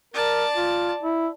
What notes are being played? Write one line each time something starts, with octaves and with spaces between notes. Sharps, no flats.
A#4 D5 A5
F4
E4